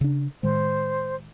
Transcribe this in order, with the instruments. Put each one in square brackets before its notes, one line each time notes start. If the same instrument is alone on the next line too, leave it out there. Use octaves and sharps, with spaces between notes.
[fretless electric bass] C#3 D4
[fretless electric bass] A2 D#3 G#3 [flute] C5